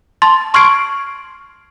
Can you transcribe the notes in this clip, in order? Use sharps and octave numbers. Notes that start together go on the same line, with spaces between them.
A5 C6 A6
C6 C#6 F6 G#6 C7 D7